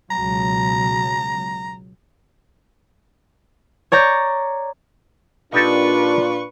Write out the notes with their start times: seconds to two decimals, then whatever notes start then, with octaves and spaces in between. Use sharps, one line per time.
0.11 C#2 B2 F#3 A#5
3.92 C#5 D5 A#5 G6
5.52 A#2 D4 D#4 F4 G4 A4 B4 C#6